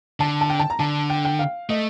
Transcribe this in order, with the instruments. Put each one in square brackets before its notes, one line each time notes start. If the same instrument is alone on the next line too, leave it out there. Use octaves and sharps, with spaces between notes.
[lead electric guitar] D3 [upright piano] A5
[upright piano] A5
G5
A5
A#5
[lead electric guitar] D3 [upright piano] A5
[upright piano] G5
G5
F5
[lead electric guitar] A3 [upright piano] D#5